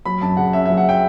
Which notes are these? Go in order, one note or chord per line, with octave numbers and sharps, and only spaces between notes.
F#3 B5
F#2 A5
C#3 F#5
C#4 E5
F#3 E5
F#5
G5